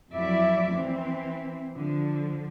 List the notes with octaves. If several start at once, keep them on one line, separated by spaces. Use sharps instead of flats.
F2 F#3 E4 D5 E5
E3 C4
D3 F3